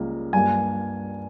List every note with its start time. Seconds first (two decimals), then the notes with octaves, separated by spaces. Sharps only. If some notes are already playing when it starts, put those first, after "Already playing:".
Already playing: C#2 C#3 G3 A#3
0.33 G2 G3 A#3 G#5